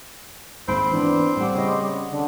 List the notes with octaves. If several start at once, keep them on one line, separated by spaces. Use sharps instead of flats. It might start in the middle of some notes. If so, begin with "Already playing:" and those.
D#2 G#2 C4 B5
E3 B3 D4
A2 G3 F#5 E6
C#3 C#5 D#5
D3